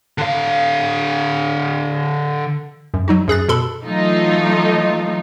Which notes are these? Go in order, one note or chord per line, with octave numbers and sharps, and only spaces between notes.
D3 F5
F#2
F#3 D#4 F#4
F#2 G#4 F#6 A6
B2 A4 B5
E3 F#3 A3 D#4 F4